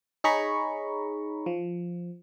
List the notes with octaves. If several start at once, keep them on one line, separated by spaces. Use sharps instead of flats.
D#4 G#4 C#5 A#5 B5 C#6
F3